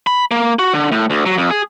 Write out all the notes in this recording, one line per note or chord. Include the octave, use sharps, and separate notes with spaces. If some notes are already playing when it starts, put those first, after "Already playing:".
B5
A#3
F#4
D3
A2
D2
F#3
F2
G#4